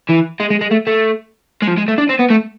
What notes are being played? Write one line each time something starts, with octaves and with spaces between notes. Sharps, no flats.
E3
G#3
G#3
G#3
A3
A3
G#3
F3
G#3
A3
D4
C4
B3
A3